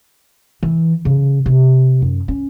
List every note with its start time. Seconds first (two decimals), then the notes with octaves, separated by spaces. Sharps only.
0.63 E3
1.05 C#3
1.46 C3
2.02 F#2
2.28 C#4